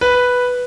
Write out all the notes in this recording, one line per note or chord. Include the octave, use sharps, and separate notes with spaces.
B4